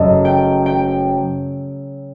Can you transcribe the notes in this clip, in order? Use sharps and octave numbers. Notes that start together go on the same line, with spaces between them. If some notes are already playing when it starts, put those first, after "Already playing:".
Already playing: F#1 F#2 F#3 A3 D#5 A5
G5
G5